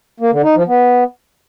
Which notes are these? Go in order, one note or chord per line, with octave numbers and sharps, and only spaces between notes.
A#3
D3
D#4
F3
B3